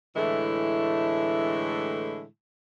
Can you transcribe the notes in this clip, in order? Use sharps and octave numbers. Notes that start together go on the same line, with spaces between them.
A2 D3 E3 G#3 A3 E4